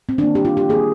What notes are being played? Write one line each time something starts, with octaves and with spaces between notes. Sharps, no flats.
C4
D#3 A#3 D4
G4
F4
G4
D#3 A#3 G#4